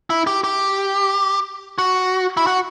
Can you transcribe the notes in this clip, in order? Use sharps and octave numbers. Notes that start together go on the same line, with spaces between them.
E4
G4
G4
F#4
E4
F#4